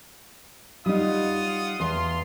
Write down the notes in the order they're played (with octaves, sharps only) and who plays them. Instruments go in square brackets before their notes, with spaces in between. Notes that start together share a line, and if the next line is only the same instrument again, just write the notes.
[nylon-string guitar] G3 D#4 [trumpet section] F4 F#5 D#6
[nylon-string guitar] E2 [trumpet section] F4 C6